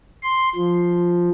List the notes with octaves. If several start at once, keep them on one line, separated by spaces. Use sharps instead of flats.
C6
F3